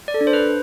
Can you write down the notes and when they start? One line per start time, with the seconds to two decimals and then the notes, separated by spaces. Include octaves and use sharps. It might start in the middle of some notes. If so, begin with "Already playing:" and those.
0.08 D5
0.14 A4
0.21 D4
0.27 C5
0.33 B4